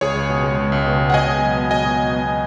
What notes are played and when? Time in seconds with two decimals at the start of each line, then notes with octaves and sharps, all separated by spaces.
0.01 C#2 G#4 C#5
0.16 C#2
0.29 B2
0.44 G#3
0.58 C#2
0.72 C#2
0.86 B2
1.00 G#3
1.10 F#5
1.14 B2 D#5 G#5
1.28 B2
1.42 F#3
1.57 B3
1.70 B2 D#5 G#5
1.85 B2
1.99 F#3
2.12 B3